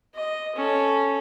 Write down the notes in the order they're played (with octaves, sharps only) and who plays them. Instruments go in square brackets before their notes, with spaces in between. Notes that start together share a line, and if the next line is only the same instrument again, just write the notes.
[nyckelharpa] D#5
C#4 A4